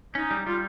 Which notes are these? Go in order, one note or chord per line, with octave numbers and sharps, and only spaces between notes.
C#4 D#4
G3
G3 F4